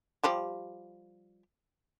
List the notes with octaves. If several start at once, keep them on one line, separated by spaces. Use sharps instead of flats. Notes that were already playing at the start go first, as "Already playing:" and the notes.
F3 G3 G4